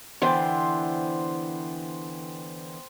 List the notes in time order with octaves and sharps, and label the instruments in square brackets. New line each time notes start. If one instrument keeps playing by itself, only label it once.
[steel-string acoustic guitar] D3 E3 B3 [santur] C5 G5